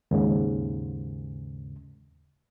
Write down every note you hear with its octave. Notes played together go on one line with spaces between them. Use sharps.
D#2 G#2 C#3